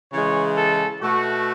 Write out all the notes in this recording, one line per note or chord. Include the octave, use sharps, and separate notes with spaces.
C#3 E3 G#3 C#5
A4
B2 A3 F#4